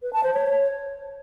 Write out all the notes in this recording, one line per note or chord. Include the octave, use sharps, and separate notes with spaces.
B4
A5
C5
C#5